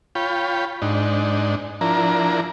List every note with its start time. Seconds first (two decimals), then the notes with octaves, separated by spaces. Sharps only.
0.15 F4 C#5 G5 B5
0.82 G#2 D4 D#4
1.81 F3 D4 E4 A#4 A#5